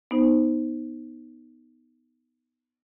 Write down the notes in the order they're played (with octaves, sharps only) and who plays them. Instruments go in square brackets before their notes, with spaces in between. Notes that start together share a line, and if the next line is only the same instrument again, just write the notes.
[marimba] B3 D#4 C5